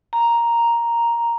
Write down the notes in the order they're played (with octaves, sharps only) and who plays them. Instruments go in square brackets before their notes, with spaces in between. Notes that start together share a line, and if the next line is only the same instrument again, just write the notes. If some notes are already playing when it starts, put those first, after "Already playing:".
[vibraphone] A#5